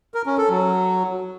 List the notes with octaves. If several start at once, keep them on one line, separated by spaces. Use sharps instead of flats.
A#4
C#4
A4
F#3